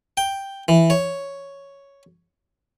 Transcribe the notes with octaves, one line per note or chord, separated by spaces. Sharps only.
G5
E3
C#5